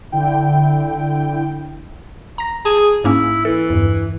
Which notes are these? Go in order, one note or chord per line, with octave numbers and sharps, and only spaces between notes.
D3 E4 G5
A#5 A#6
G#4 A5
G#2 A#3 C#4 E4
E3 A4
E2 G2